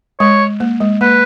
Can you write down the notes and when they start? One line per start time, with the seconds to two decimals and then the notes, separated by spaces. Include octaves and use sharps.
0.20 G#3 C#5
0.60 A#3
0.81 G#3
1.01 A#3 B4